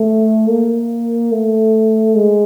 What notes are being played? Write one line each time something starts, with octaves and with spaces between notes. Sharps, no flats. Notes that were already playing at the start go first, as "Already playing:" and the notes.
Already playing: A3
A#3
A3
G#3